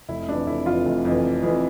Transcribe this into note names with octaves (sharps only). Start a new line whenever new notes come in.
F1 E4
F2 E3 D4
F1 E4
F2 E3 F4
F1
F2 E3
F1
F2 E3